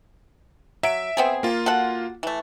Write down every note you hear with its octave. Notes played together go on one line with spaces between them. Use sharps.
F#3 E5 D7
B3 C4 G#4
A#3 F4
F#4 A4 F#5
E3 A3